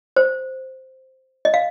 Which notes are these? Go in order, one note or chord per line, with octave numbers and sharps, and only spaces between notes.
C5
D#5
F5